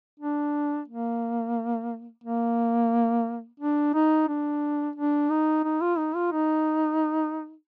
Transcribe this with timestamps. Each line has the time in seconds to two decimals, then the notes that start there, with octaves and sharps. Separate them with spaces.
0.20 D4
0.88 A#3
2.24 A#3
3.60 D4
3.94 D#4
4.28 D4
4.96 D4
5.30 D#4
5.64 D#4
5.81 F4
5.98 D#4
6.15 F4
6.32 D#4